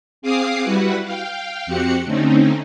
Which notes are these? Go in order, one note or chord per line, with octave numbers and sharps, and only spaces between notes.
C4 G#4 F5 D6 D#6 C7
G3 E4 F#4 B4 F#5
F5 G5
F2 C4 F#4 G4 F#5 C#7
D3 A3 C4 C#4 D#4